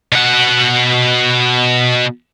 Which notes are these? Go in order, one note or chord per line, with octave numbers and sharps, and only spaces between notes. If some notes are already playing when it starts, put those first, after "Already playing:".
B2 F#5